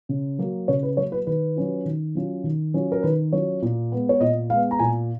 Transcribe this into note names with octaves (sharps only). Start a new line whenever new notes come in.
C#3
F#3 A#3
C#3 C#5
B4
F#3 A#3 C#5
B4
D#3 B4
F#3 C#4 F4
D#3
F#3 C#4 F4
D#3
F#3 C#4 F4
A#4
D#3 B4
F#3 C#4 F4 C#5
A#2
G#3 B3
C#5
A#2 D#5
G#3 B3 F5
A#5
A#2 G#5